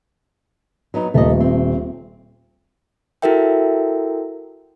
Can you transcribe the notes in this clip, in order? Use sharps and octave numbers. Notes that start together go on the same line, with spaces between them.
F#3 B3 D#4
D#1 A3 A#3 D#5
C4
E4 F#4 A4 A#4 E5 G5